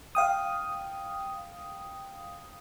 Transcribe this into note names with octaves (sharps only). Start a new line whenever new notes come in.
F5 G5 D#6